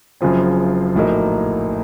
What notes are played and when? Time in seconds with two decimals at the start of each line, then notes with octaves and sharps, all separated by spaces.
0.21 F#1 F#2 C#3 F3 C4
0.95 A#1 A2 F#3 A#3 D#4